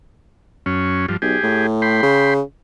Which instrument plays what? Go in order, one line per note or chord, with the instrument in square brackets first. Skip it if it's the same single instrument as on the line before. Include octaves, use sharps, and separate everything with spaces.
[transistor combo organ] F#2 C#4
G2 F3
[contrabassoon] B1 [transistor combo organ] G4 G#4
[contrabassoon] A2
[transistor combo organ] G5 B5 C6
[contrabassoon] C#3